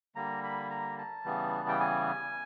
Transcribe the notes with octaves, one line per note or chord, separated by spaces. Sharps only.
D3 G3 A#3 A#5
B5
A#5
A5
C#3 E3 G3 B3
G5
G#5